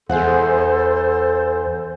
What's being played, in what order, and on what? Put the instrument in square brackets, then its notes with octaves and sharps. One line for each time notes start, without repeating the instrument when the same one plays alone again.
[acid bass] E2 [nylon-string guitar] G#4 E5 F#5 [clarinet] A4 [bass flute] C5